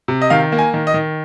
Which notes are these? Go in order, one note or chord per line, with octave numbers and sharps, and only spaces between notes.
C3
D#5
D#3 F5
A#3
G#5
D#3
D#5
D#3